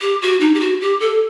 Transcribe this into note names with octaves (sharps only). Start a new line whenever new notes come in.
G4
F#4
D#4
G4
F#4
G4
A4